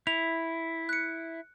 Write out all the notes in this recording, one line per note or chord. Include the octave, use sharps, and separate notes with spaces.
E4 F7
F#6 C#7